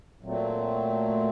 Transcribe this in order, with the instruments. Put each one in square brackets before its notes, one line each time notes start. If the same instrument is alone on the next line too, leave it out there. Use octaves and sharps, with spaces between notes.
[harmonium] A#2 F#3 A3 C4